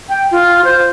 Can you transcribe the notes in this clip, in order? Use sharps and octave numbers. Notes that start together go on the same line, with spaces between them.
G5
F4
C5